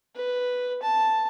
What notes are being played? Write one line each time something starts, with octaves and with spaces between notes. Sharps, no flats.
B4
A5